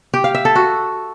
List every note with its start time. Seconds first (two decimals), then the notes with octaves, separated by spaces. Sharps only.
0.14 G4
0.24 F5
0.35 E5
0.45 A4
0.55 F#4